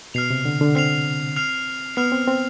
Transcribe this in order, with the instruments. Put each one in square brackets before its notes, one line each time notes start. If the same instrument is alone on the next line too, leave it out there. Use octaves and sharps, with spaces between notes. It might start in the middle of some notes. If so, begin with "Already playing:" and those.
[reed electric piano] B2 [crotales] F6 C7 F7
[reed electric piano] C3
D3
D3
[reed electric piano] C4 [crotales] F6 C7 F7
[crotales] F6 C7 F7
[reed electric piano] B3 [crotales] F6 C7 F7
[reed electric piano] C4
C4